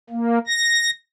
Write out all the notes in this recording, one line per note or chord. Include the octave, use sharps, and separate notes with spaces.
A#3
A#6